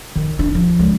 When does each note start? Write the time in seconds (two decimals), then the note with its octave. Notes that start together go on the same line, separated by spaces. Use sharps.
0.16 D#3
0.39 D4
0.55 F3
0.79 C#2